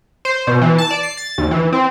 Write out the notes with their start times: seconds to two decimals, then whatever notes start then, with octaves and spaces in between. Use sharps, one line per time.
0.25 C5
0.47 B2
0.61 E3
0.78 A5
0.91 D5
1.03 C7
1.17 A6
1.38 D#2
1.51 E3
1.73 C4